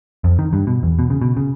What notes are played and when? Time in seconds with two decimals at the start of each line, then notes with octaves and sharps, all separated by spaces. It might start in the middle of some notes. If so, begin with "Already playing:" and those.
0.24 F2
0.39 D#3
0.53 G2
0.67 B2
0.83 E2
0.99 B2
1.10 C#3
1.22 B2
1.37 C#3